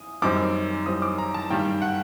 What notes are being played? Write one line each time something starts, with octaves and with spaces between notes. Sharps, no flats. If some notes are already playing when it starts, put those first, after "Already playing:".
Already playing: D#6
F#2 D#3 G3 C4 D#4 D6
F#2 D#3 G3 C4 D#4 D#6
D6
A#5
A5
G2 D#3 G3 G5
F#5